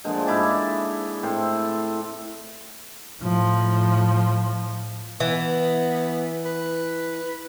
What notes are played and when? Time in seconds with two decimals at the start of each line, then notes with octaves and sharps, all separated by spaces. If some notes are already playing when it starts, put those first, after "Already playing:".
0.04 A#2 D3 F3 G#3
0.27 G#2 E4 D5 A5
1.23 A2 C4 A4 C6
3.21 A2 F3
5.20 E3 B3
6.46 B4